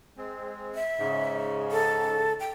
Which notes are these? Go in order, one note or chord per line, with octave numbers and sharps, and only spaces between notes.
G#3 C4
E5
G#2 C#3
A4
G5